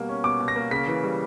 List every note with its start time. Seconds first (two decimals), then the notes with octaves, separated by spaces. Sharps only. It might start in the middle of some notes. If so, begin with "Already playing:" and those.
Already playing: B2 G3 A#3
0.09 C#4
0.24 B2 D6
0.40 B2
0.48 A#6
0.56 A#3
0.71 C#3 B6
0.88 E3
1.04 G3